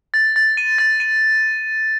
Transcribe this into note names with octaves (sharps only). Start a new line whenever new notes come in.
A6
A6
D#7
A6
D#7